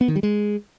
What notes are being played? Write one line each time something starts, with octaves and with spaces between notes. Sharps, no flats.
B3
D#3
G3
G#3